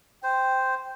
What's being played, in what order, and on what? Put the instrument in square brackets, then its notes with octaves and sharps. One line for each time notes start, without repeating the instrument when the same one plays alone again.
[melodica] C5 [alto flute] G5